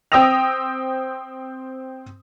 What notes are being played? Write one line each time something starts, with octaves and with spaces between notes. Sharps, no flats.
C4 G5 D#6 E6 A#6 F7